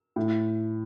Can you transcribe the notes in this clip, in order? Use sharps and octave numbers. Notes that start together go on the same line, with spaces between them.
A2